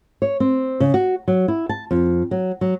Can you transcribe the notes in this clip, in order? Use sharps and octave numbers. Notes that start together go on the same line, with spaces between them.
C#5
C4
C#3
F#4
F#3
E4
A5
F2
F#3
F#3